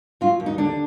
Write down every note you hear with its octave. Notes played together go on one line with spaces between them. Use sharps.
F#3 F4
D#2
D#4
D3 D4